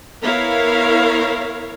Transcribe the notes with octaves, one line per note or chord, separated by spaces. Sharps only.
B3 E4 A#4 C#5 F5